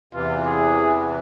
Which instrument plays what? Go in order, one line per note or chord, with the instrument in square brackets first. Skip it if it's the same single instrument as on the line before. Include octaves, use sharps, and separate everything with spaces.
[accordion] E2 C3 E3 [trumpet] F4
[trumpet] G#4